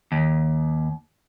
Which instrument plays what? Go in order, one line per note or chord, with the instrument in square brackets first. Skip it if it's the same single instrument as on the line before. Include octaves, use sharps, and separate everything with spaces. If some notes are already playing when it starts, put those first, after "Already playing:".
[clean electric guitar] D#2